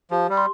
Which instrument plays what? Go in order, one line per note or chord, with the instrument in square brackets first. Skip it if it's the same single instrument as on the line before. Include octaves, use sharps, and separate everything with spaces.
[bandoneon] F3 [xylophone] G4
[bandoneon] G3
[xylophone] C6